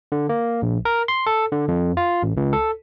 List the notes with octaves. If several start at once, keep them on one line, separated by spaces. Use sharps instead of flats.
D3
A#3
A#1
A#4
C6
A4
D3
F2
F4
A1
C#2
A4